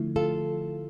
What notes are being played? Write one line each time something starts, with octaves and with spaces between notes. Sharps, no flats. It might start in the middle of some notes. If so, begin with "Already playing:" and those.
Already playing: D3 F3 A3 E4
F4 A4